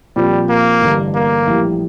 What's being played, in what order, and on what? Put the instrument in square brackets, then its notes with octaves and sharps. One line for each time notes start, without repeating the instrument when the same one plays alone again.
[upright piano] A#2 F3 C4 G4 [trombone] G3
[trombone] A#3
[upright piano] A1 G2 D3
[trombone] A#3
[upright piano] A#1 A2 E3 G3